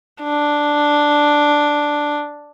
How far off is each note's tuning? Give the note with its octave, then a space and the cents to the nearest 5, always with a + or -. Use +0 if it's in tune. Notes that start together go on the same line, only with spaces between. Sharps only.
D4 +0